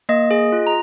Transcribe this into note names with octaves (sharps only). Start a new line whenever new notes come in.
A#3 D#5
G#4
F4
A#5